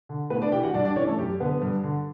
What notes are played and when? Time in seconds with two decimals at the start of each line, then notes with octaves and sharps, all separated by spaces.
0.09 D3
0.30 A2 B3 B4
0.42 D4 D5
0.52 E3 G4 G5
0.63 F#4 F#5
0.74 G2 D4 D5
0.85 D4 D5
0.96 E3 C#4 C#5
1.07 A3 A4
1.18 F#2 G4
1.40 D3 B3 B4
1.62 G2
1.83 D3